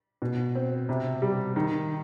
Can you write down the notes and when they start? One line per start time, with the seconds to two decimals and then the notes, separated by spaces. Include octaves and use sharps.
0.22 B2
0.55 C4
0.89 C3
1.22 G3
1.56 D#3